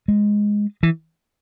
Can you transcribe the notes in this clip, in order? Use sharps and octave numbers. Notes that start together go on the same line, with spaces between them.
G#3
E3